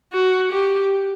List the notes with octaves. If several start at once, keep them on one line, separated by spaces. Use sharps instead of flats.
F#4
G4